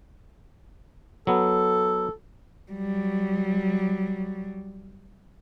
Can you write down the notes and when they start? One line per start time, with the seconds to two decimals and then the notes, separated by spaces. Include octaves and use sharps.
1.27 F#3 B3 A4
2.72 F#3 G3